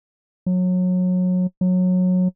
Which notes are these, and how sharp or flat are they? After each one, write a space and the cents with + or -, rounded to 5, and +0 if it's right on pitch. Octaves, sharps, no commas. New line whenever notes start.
F#3 -25
F#3 -20